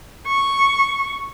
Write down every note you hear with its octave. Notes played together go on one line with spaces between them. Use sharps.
C#6